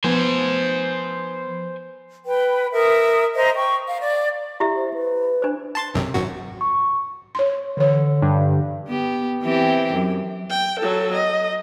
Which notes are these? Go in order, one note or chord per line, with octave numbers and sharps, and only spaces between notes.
F3 B3 C5 G#5
B4 G5
A#4 E5 D#6
C5 D#5 E5 A#5
G5 C#6
F5
D5
E4 G4 E5
C5
B4
D4 C5
A5 C6 A6
B1 F#2 C3
G#1 F#2 F#4
C#6
C#5 C6
D3 E3 C#5
G2
B3 G4
E3 C4 G4
F#2
G5
F#3 A4
D#5